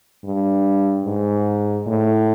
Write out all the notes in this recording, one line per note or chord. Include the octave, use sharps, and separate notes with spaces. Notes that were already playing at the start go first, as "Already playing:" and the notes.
G2
G#2
A2